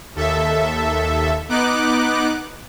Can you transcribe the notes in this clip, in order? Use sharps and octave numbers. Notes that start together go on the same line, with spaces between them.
D#2 A4 E5
B3 D#4 D6 F#6